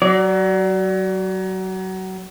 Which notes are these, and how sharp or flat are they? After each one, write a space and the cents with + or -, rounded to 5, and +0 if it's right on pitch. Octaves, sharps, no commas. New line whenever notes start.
F#3 +25 D5 -20